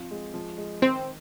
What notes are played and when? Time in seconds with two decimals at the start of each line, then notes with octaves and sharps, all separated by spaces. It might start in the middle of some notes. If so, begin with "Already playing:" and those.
Already playing: F3 C4 F4
0.11 G#3
0.34 F3
0.58 G#3
0.82 D#3 C4